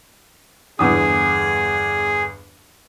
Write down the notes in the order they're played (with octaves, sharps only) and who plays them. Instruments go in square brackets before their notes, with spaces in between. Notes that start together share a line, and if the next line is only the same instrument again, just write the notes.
[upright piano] G1 E2 D#6 [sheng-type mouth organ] G#4